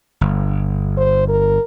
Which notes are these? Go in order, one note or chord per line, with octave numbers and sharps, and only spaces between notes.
G1
C5
A#4